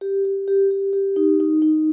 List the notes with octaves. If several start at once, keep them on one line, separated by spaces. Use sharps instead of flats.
G4
G4
G4
G4
G4
D#4
D#4
D#4